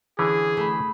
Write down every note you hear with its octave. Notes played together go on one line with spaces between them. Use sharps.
D3 E3 C#4 G#4
A3 B5